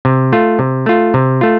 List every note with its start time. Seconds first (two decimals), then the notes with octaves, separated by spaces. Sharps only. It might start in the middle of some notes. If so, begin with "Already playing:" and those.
0.05 C3
0.32 A3 F4
0.59 C3
0.86 A3 F4
1.14 C3
1.41 A3 F4